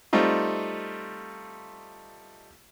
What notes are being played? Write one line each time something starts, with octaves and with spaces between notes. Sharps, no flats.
G3 A3 C4 D#4 F4